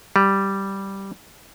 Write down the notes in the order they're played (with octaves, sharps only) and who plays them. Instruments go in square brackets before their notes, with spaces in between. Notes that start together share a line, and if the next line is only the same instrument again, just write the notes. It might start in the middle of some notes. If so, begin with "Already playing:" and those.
[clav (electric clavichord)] G3